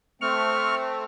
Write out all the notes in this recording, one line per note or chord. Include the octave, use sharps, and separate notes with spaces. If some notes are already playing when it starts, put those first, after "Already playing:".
A3 C4 C#6 F6